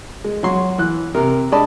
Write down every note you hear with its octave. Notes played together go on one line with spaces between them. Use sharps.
G#3
F#3 F#4 C6
E3 F#6
C3 A#4
G#3 D4 D5 D#5 A5 B5